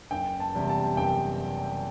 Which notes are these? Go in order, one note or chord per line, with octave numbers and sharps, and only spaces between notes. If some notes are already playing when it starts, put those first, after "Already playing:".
F#1 G5
A5
E2 C3 G3
A5
F#1 G5